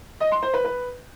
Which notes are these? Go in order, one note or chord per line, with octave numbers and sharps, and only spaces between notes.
D#5
C6
C5
B4
B4